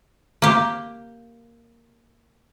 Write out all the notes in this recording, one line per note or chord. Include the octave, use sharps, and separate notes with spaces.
A#3 G4